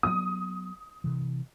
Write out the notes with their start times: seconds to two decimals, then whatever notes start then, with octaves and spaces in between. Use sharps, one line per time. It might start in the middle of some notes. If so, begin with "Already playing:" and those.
0.03 F#3 B3 D#6
1.04 C3 E3